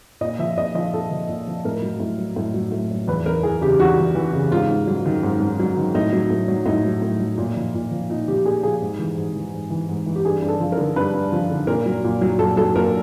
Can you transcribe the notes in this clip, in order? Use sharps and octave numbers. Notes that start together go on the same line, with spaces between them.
A#2 D#5
F3 E5
A#2 D#5
F3 D#5
A#2 A4
F3
A#2
F3
A2 A#4
F#3
A2
F#3
A2
F#3
A2
F#3
E2 B4
E2 A#4
E3 G#4
C#3 G4
E2 F#4
E2
E3
C#3
G#2 F4
G#2
F#3
D#3
G#2
G#2
F#3
D#3
A2 D#4
F#3
A2
F#3
A2 D#4
F#3
A2
F#3
A#2
F3
A#2
F3
A#2 D#4
F3 G4
A#2 G#4
F3 G#4
G#2
E3
G#2
E3
G#2
E3
G#2
E3
G4
G2 G#4
G2
A4
F3
A#4
D3
G2 B4
G2
F3
D3
A#2 A#4
F#3
A#2
F#3
A#2 A4
F#3 A4
A#2 A#4